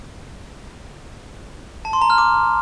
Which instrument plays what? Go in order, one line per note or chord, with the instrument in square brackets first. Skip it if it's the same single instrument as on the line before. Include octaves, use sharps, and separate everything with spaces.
[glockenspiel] A5
C6
A#5
F6
D6